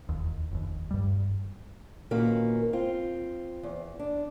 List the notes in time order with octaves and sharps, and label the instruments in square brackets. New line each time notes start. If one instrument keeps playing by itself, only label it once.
[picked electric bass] E1 D#2
F1 D#2
G2 G3
[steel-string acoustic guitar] A#2 D#3 A#3 B3 C#4 F#4
C4 F4
E2
D4